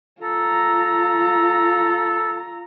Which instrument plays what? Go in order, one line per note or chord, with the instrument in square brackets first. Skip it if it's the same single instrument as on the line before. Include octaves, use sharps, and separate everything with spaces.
[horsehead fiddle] F4 A#5 [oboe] A4